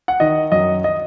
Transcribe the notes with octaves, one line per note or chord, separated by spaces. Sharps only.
F#5
D#3 D#5
F#2 D#5
D#5